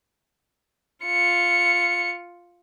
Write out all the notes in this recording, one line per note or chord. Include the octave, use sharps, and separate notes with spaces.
F4 C#7